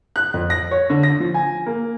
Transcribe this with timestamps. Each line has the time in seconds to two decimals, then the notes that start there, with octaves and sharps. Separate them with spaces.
0.16 F#6
0.34 F2
0.50 A#6
0.71 C#5
0.90 D3
1.03 A#6
1.20 F3
1.34 G#5
1.66 A#3